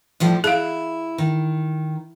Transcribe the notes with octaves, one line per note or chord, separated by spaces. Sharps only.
A2 F3 G3
E4 G#4 F5
D#3